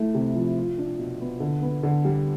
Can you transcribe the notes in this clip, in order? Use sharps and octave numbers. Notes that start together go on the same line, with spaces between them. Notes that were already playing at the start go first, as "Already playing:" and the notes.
Already playing: A3 E4
C3
F3
F4
D4
B2
B3
D3
B3
D3
G3